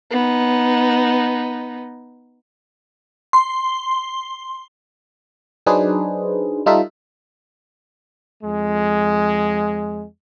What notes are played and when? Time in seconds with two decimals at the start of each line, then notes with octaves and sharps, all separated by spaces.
0.11 B3 D#4
3.33 C6
5.66 F#3 D4 D#4 G#4 B4 C5
6.66 G3 D#4 F4 A4 E5
8.43 F2 G#3